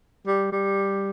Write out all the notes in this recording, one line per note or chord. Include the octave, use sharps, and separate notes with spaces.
G3
G3